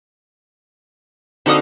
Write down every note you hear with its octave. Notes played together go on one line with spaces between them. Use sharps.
D3 C4 D4 D#4 F#4 A4 F5 D#6